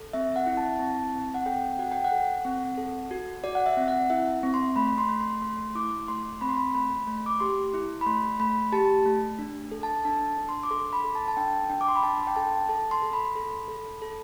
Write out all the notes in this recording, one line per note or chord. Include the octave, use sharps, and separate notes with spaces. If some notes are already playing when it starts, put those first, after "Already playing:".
Already playing: A4
C4 E5
F#5
E4
A5
C4 A5
C4
F#5
A4 G5
F#4 F#5
G5
F#5
A4
C4
A4
F#4
F#4 D5
F#5
E5
C4
F#5
E4 E5
C4
C6
A3 B5
C6
A3
C6
A3 C6
E4 D6
A3 C6
C4 B5
C6
B5
A3 B5
A3
D6
G4 C6
E4
B5
A3 C6
A3 B5
G4 A5
A3
D4
A4
A5
D4 A5
D4
C6
D6
A4 C6
B5
A4
A5
A5
D4 G5
D4 G5
D6
C6
B5
D4 A5
G5
A4 A5
A4 A5
C6
A4
B5
A4
A4
A4